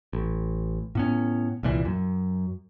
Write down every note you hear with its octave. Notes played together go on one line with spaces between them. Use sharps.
A1
A2 B3 C#4
C2 A#2 E3
F#2